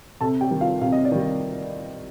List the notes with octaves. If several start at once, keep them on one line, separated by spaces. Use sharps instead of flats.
C3 A4 A5
G4 G5
D#3 G3
F4 F5
C3 F5
D#5
D5
D#3 G3